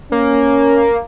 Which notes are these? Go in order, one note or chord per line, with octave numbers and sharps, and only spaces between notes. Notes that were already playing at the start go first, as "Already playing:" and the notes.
A#3 C#4